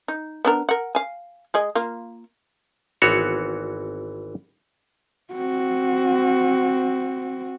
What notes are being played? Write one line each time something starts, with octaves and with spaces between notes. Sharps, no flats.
D#4
B3 D4 A#4
A#4 F#5
F5 G#5
G#3 G#4 D#5
A#3 F4
G#1 E3 B3 C4 F#4 C#5
C4 F#4